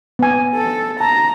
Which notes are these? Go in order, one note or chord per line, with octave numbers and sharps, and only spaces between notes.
B3 G#5
A4
A5 A#5